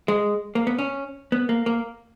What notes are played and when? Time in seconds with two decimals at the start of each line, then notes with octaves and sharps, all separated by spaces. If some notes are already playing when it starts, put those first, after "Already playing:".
0.08 G#3
0.55 A#3
0.67 B3
0.79 C#4
1.32 B3
1.49 A#3
1.66 A#3